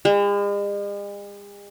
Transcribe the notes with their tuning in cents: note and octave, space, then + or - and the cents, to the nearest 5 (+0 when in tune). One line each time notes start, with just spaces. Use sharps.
G#3 -45